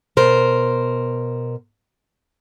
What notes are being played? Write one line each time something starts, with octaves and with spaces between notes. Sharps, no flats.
B2 A#4 C5